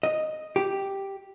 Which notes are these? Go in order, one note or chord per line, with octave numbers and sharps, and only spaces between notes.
D#5
G4